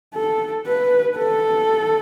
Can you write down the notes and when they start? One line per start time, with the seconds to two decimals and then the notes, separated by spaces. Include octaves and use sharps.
0.15 A4
0.67 B4
1.18 A4